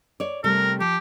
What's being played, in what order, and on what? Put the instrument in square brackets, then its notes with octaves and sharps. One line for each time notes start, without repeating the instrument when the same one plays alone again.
[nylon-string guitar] C#5 D5
[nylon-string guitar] C3 G3 A3 [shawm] A#4
[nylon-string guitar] F3 [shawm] G4